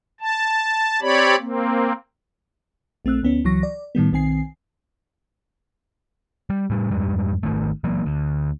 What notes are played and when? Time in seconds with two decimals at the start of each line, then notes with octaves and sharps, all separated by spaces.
0.21 A5
1.02 C4 G4 C#5 D5 B5
1.39 A#3 C4
3.05 A#1 A3 C4 E6 F#6
3.23 D2 B3 C#4
3.44 C#2 E3 F#3 C#6 A#6
3.63 D5
3.95 A2 D#3 G3 B3
4.12 B1 D#3 C4 G#5 C7
6.50 G3
6.70 A2 G3
6.91 F2 G#2 G3
7.43 G#1 D#3 A3
7.84 E3 F#3 A#3
8.06 D2